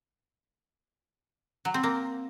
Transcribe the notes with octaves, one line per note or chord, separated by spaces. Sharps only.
F#3
C4
A#3